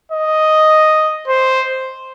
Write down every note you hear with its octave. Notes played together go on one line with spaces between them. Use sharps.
D#5
C5